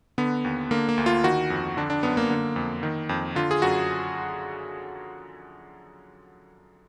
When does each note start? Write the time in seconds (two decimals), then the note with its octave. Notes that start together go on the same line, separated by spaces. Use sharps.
0.18 D3 B3
0.45 D#2
0.71 D3 A#3
0.89 A#3
0.98 D2
1.06 F4
1.24 D#3 F#4
1.50 F2
1.77 D3 D4
1.90 D4
2.03 F#2 B3
2.17 A#3
2.30 D3
2.56 F2
2.83 D#3
3.09 F2
3.35 D3 F4
3.51 G#4
3.62 F#2 F#4